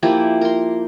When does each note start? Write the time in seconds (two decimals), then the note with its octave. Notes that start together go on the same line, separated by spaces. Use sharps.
0.03 F3 A#3 E4 G4
0.41 A#4 C6